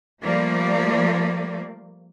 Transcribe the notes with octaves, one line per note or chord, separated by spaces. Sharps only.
F3 G3 A3 A#3 D5